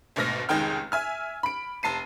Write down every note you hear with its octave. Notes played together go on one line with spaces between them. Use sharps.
G#1 D2 B2 F6 A#6
F1 C#2 D#3 G#4 G5 F6
E5 G#5 F6
B5 D7
F1 A5 C7 D#7